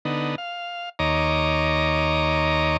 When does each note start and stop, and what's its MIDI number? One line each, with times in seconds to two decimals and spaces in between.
0.05 0.35 50
0.05 0.35 59
0.05 0.35 63
0.38 0.89 77
0.99 2.77 39
0.99 2.77 73
0.99 2.77 75
0.99 2.77 82
0.99 2.77 86